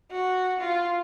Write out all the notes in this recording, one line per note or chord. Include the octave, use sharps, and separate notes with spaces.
F#4
F4